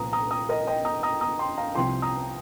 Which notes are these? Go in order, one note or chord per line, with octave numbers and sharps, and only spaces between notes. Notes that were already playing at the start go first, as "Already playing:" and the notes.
Already playing: C2 A#2 F3 A#5 D#6
A#5 D#6
A#5 D#6
A#4 D#5
D#5 G5
A#5 D#6
A#5 D#6
A#5 D#6
G5 C6
F5 A#5
C2 C3 F3 G5 C6
A#5 D#6